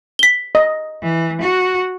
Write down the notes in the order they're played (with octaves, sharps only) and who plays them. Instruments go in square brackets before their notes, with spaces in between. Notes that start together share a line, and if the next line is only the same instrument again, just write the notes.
[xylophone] B6 G7
[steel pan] D#5
[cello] E3
F#4